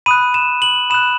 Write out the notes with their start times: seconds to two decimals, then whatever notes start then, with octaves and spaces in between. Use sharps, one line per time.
0.06 B5 D#6 F#6 D#7
0.34 E7
0.62 F#7
0.90 B5 D#6 F#6 E7